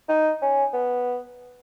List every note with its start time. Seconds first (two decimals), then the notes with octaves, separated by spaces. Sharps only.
0.09 D#4
0.42 C#4
0.73 B3